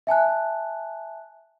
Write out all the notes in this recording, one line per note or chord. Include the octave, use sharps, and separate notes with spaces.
E5 G#5 A5 F#6